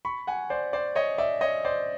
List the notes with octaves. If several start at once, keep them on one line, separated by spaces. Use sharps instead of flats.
B5 C#6
F#5 G#5
C5 D5
C5 D5
C#5 D#5
D5 E5
C#5 D#5
C5 D5